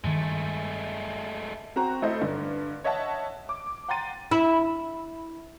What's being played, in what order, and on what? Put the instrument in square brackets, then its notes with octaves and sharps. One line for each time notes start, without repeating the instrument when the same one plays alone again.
[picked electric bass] G2 D#3 [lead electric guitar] G#3 A3
[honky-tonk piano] C4 F#4 A#5
A3 E4 A4 C5 D#5
G2 D3
C#5 D#5 E5 F#5 A5
D6
F#5 G5 A#5 C6 A6 D#7
[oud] E4